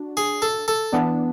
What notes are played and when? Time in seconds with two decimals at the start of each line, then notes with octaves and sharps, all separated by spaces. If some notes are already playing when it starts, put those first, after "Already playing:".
Already playing: D4 F#4
0.17 G#4
0.42 A4
0.68 A4
0.92 E3 B3 D4